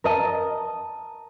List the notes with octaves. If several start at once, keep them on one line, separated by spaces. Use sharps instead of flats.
A#4 D#5 A5